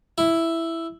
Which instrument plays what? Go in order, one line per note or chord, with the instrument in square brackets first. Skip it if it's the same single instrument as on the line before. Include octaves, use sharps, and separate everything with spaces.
[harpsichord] E4